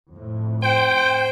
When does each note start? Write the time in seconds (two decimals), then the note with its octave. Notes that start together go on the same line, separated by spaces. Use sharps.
0.11 F2 A2
0.62 C5 G5